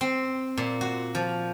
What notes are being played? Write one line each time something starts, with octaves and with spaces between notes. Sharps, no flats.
C4
A#2
F#4
F3